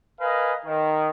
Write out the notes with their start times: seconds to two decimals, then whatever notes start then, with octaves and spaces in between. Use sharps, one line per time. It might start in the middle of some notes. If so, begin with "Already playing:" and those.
0.20 A#4 B4 D#5 F5 G#5
0.66 D#3